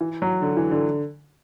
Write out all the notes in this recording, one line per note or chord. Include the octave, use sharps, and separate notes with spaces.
E3
F#3
D3
E3
D3